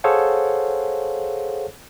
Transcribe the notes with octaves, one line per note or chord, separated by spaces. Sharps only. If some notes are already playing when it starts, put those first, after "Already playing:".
G#4 A4 C5 C#5 F5 F#5